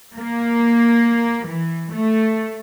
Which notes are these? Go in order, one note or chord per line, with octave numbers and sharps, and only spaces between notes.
A#3
E3
A3